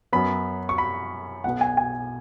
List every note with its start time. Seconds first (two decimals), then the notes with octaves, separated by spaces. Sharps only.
0.13 F#2 F#3 B3 B5
0.69 C#6
0.78 B5
1.44 B1 B2 B3 F#5
1.61 G#5
1.77 G#5